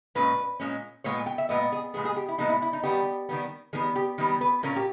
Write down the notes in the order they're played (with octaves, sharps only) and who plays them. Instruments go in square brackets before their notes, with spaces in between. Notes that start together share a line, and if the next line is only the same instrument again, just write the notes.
[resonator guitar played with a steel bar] A#2 G#3 C#4 B4
A#2 G#3 C#4
A#2 G#3 B3 C#5
G#5
G5
E5
A#2 G#3 B3 D#5
G#4
A#2 G#3 B3 G#4
G#4
G4
E4
A#2 G#3 B3 D#4
E4
E4
D#4
D#3 G3 B3 G4
D#3 G3 B3
D#3 G3 B3 G#4
G4
D#3 G3 B3
B4
A#2 A#3 C#4 A#4
G4